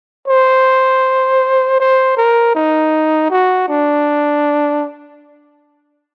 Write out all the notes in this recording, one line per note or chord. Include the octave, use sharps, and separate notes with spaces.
C5
C5
A#4
D#4
F#4
D4